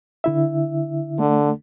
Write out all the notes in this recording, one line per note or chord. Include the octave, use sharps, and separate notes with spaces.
D3 E4 E5
D3 A3